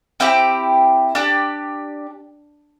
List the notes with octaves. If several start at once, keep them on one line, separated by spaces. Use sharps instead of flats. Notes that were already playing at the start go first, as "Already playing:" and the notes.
C4 E4 G4 G5
D4 G4